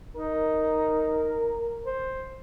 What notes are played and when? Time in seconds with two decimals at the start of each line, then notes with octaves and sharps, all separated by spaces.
0.15 D#4 A#4
1.85 C5